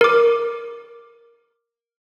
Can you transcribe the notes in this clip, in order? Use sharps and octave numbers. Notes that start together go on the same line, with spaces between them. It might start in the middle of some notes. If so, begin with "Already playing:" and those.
A#4 D6